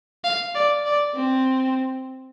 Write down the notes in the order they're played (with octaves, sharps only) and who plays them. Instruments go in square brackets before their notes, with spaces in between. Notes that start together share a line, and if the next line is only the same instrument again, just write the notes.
[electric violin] F5
D5
D5
C4